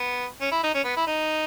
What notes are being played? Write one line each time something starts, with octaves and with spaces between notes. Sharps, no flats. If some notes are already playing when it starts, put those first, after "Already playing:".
Already playing: B3
C#4
E4
D#4
C#4
B3
E4
D#4